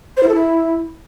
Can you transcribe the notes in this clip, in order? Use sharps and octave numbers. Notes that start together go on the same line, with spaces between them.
C5
E4
A4
E4